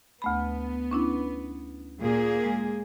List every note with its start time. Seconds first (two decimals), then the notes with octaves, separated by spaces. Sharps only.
0.22 D2 A3 B3 B5
0.91 C#4 D4 E4
2.01 A#2 A#3 G#4
2.44 G#3